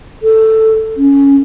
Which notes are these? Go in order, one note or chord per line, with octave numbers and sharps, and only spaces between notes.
A4
C#4